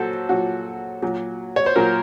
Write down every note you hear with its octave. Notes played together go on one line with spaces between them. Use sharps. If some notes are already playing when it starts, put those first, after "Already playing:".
Already playing: A#2 F#3 F#4 A4 C5
A#2 F#3 F#4
A#2 F#3
C#5
C5
A#2 F#3 A#4